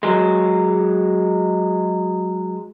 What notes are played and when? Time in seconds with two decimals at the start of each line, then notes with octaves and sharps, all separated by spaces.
0.03 F#3 G#3